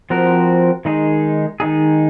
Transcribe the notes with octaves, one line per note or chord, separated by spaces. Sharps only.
F3 C4 F#4 A#4
D#3 G#3 D#4 G#4
D#3 G#3 D#4 G#4